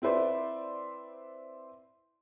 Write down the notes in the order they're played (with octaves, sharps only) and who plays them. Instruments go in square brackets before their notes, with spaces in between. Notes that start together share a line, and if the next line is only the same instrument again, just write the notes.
[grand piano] C4 E4 B4 C5 D5